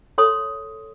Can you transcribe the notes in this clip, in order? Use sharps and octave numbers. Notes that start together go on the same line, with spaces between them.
A4 C#5 C6 D#6